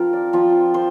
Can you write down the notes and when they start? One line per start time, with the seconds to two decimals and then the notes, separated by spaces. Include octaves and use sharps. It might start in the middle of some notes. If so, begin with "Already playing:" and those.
Already playing: F3 C4 F4 A#4
0.13 D5
0.33 F3 C4 F4
0.74 C5